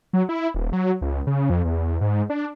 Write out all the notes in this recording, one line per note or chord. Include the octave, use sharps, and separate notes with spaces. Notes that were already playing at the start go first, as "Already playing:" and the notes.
F#3
E4
D#1
F#3
C#2
C#3
F2
E2
G#2
D4